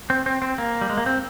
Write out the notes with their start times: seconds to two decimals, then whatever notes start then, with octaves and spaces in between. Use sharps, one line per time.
0.10 C4
0.26 C4
0.42 C4
0.58 A#3
0.81 G3
0.90 G#3
0.97 A#3
1.06 C4